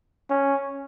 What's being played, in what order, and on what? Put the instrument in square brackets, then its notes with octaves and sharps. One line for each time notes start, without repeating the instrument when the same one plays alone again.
[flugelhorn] C#4